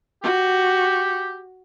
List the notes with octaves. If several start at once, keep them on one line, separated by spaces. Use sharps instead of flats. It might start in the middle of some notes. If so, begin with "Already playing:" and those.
F#4 G4